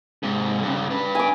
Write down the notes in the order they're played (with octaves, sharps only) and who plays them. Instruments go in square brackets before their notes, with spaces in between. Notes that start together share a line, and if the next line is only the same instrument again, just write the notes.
[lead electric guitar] G#2 C3
G2 C#3
D4 B4
[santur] G#5 D6